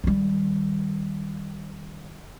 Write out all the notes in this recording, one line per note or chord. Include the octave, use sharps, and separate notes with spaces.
D#3 G3